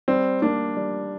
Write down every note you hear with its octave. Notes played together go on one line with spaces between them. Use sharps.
G3 C4
A#3 D4
G3